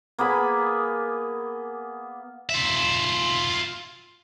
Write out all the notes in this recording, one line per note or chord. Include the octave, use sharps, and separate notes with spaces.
A#3 B3 G#4 B5
F4 E5